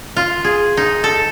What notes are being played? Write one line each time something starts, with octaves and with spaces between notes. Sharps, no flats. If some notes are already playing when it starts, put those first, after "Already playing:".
F4
G#4
D#4
A4